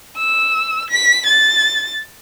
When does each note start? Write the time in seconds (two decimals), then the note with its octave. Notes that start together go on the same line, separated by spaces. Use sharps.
0.18 E6
0.90 B6
1.26 A6